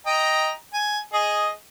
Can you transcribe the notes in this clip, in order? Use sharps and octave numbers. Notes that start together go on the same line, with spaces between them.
D#5 G5 A#5
G#5
G#4 D#5